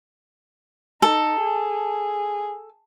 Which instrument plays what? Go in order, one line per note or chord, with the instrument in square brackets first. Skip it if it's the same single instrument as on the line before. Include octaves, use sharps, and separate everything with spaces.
[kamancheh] D#4 [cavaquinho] A4
[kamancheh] G#4